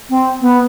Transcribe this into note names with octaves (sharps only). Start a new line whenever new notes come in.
C4
B3